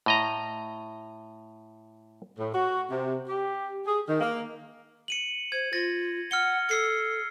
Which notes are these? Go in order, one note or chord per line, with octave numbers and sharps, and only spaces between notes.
A2 D#5 A#5
A2
F#4
C3
G4
G#4
D#3
A#3
C#7 D#7 F#7
C5 G#6
F4 A6 A#6
F#5 F6 C#7 G7
A4 E6 C7 C#7